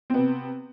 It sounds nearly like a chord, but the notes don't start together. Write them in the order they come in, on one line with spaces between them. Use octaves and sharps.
C4 B3 C3